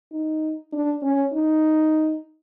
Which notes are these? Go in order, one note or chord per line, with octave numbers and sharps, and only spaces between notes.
D#4
D4
C#4
D#4